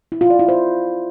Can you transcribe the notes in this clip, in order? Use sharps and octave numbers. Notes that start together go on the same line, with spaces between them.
E4
F4
D5
E4
C5